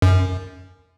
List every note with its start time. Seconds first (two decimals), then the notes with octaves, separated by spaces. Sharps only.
0.02 F#2